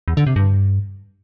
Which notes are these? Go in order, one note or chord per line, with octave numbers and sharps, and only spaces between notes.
E2
D3
C3
G2